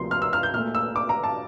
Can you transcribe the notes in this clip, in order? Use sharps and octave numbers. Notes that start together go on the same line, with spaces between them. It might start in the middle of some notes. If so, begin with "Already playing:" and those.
Already playing: D2 C3 F3 A#3 C6
F6
E6
F6
G6
A#2 A3 F6
E6
D6
A#5
A5